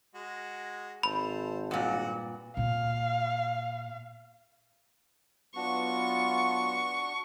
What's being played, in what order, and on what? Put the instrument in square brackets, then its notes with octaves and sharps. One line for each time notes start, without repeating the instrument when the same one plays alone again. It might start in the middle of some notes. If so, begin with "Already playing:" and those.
[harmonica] G#3 F#4
[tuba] G#1 [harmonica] A4 C5 [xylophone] B5
[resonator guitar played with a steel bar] G2 A#2 [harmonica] F#4 F#5
[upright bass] A#2 A#3 [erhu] F5
[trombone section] F#3 B3 F4 [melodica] D4 F#4 [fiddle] C#6